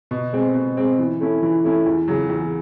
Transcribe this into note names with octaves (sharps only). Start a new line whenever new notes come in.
B2
G#3 C4
B2
G#3 C4
E3
A3 C#4 E4
E3
A3 C#4 E4
E2
C#3 F#3
E2